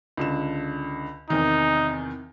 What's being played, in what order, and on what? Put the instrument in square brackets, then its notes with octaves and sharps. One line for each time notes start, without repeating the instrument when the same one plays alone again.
[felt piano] C#2 D3 E7
[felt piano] E2 C3 D#3 [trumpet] D#4